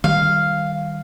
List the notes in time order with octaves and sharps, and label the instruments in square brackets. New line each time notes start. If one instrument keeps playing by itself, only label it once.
[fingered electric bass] D#3 G3 [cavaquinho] F5